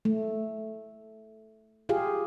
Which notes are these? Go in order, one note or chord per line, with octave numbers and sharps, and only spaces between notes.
A3
F4 G4 G#4 F5